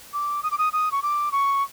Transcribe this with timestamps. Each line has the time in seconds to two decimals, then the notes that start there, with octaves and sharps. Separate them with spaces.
0.13 D6
0.43 D#6
0.51 D6
0.58 D#6
0.73 D#6
0.92 C#6
1.03 D6
1.32 C#6